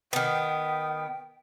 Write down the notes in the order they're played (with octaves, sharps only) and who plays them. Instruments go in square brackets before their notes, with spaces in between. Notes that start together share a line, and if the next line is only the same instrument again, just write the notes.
[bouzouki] D#3 B3 [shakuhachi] G5